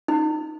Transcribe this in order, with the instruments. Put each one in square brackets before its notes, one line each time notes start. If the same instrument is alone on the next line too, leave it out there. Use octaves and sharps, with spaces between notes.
[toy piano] D#4